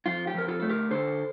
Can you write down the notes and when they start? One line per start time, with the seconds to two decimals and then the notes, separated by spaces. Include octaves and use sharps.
0.06 F2 F4
0.27 G4
0.34 F2 A#4
0.48 F4 A4
0.60 A3 A4
0.69 G4 A#4
0.91 D3 A4 C5